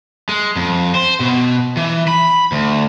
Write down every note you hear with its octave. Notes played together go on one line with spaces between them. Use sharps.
G#3
F2
C5
B2
E3
B5
D2